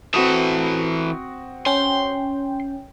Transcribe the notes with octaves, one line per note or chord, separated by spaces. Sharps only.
E3 C4 F#4 A4 D#6
C#4 G5 C6